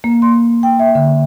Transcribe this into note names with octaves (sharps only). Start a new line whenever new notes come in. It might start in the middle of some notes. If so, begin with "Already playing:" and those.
A#3
C6
G5
E5
D3